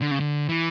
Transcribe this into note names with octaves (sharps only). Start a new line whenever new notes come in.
D3
C#3
D3
E3